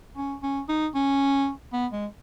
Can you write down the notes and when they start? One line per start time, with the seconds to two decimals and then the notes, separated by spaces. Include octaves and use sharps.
0.17 C#4
0.42 C#4
0.69 D#4
0.95 C#4
1.73 B3
1.92 G#3